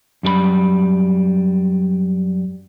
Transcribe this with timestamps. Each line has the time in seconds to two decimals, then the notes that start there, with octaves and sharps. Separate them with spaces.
0.23 F#2 G3 G#4 B5